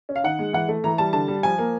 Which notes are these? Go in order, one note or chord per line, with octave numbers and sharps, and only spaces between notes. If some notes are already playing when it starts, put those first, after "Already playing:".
C#4
F5
D#3 F#5
G#3
E3 F#5
A3
E3 A#5
G3 A5
D3 A5
G3
F3 G#5
A#3